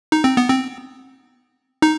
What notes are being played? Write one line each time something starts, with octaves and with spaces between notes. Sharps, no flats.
D#4
C4
B3
C4
D#4